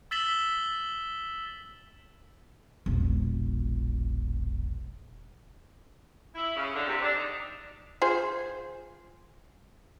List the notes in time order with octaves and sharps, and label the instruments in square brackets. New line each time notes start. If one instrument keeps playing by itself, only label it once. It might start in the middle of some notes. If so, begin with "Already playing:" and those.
[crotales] E6 A6 B6 E7 F#7 G7
[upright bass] E1 A#1
[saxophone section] E4
C#3
D3
C3
D4
D#4
[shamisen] F4 G#4 C5